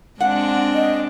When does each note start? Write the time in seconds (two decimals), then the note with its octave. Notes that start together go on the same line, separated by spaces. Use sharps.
0.20 G#3 C4 D4 F#5
0.74 D#5